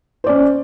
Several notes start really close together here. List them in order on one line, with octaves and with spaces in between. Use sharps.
C5 D5 C#4